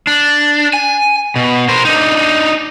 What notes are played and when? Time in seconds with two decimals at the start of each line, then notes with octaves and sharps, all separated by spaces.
0.07 D4
0.74 G#5
1.36 B2
1.69 A#4 C5
1.85 D4 D#4